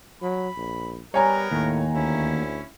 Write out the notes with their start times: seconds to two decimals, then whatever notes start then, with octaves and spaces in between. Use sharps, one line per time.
0.22 F#3 B5
0.57 A#1
1.14 G3 B3 A#4 C#5 G#5 A#5
1.51 D#2 A2
1.93 D2 C#4 E4